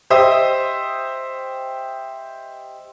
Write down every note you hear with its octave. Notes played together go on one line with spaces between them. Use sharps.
G4 C5 D#5 E5 C6 D#6